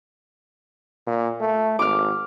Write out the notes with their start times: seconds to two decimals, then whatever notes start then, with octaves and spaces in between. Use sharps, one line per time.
1.07 A#2
1.40 A3
1.79 G#1 D6 F6